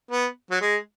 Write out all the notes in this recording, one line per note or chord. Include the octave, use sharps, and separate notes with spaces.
B3
F#3
G#3